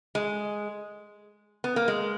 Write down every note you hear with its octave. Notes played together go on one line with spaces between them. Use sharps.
G#3
B3
A#3
G#3